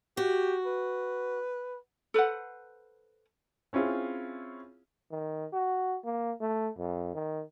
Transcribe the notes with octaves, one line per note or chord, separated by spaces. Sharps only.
F#4 G4
B4
A4 B4 C5 F#5
C4 C#4 E4 F4 G#4
D#3
F#4
A#3
A3
F2
D#3